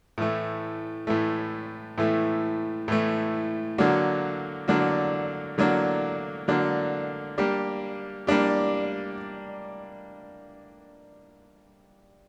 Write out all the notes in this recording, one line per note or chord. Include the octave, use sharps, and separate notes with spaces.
A2 E3 A3
A2 E3 A3
A2 E3 A3
A2 E3 A3
D3 F#3 A#3 D4 F#4
D3 F#3 A#3 D4 F#4
D3 F#3 A#3 D4 F#4
D3 F#3 A#3 D4 F#4
G3 A#3 D4 G4
G3 A#3 D4 G4